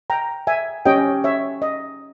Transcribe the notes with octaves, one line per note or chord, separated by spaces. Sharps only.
G5 A#5
E5 G#5
C#4 G4 C#5 D#5 G5
C#5 E5
D#5